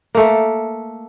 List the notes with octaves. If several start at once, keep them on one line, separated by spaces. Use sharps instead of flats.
A3 A#3